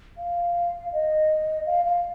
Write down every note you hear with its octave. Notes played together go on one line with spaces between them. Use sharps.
F5
D#5
F5
F5